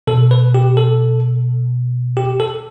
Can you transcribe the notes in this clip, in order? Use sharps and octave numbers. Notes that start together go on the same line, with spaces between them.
B2 A4
B4
G4
A4
G4
A4